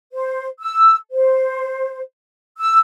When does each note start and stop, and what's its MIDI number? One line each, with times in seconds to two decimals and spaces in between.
0.13 0.47 72
0.61 0.96 88
1.12 2.00 72
2.59 2.79 88